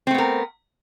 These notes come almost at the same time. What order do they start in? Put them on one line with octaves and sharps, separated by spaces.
C4 A3 B3 A#4